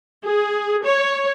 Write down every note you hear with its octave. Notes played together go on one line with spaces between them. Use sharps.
G#4
C#5